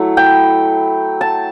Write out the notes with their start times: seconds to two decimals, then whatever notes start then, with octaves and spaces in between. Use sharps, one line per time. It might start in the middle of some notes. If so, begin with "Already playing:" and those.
Already playing: F#3 A3 E4
0.17 G5
1.21 A5